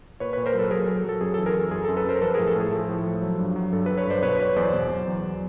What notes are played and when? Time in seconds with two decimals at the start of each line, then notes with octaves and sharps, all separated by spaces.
0.20 A#2 B4 C#5
0.33 A#2 B4 C#5
0.46 A#4 C5
0.54 F#3 A4 B4
0.71 A#2 G#4 A#4
0.84 A4
0.88 F#3
1.04 F#3 A4
1.21 F#2 G#4
1.34 A4
1.38 E3
1.46 G#4 A#4
1.56 F#2 A4
1.71 F#2 G#4
1.85 A4
1.89 F#2
1.97 A4 B4
2.05 F#2 A#4 C5
2.16 A#4
2.22 F3 A4 B4
2.34 G#4 A#4
2.38 A2
2.48 A4
2.56 A2 G#4
2.72 F3 A4
2.89 A2
3.06 F3
3.22 F#3
3.39 G2
3.56 F#3
3.72 G2 A4
3.86 A4 B4
3.90 F#3
3.98 B4 C#5
4.07 G2 C5 D5
4.23 B2 B4 C#5
4.39 F#3 B4 C#5
4.56 E2 C5 D5
4.73 B2
4.91 F#3
5.07 E2
5.24 F#3